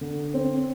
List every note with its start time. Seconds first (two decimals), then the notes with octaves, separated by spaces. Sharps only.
0.01 D3
0.34 C4